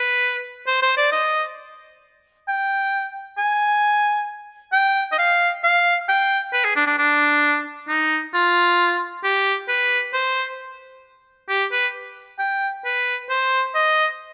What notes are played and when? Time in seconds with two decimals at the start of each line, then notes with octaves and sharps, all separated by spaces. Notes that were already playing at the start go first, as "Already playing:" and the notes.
Already playing: B4
0.67 C5
0.83 C5
0.97 D5
1.12 D#5
2.48 G5
3.38 G#5
4.73 G5
5.12 D#5
5.19 F5
5.64 F5
6.09 G5
6.53 B4
6.64 G#4
6.76 D4
6.87 D4
6.98 D4
7.89 D#4
8.34 F4
9.24 G4
9.69 B4
10.14 C5
11.49 G4
11.72 B4
12.39 G5
12.85 B4
13.30 C5
13.75 D#5